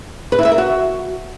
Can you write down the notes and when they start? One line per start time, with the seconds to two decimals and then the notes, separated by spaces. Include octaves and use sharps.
0.32 B4
0.39 E4
0.45 E5
0.52 A#4
0.58 F#4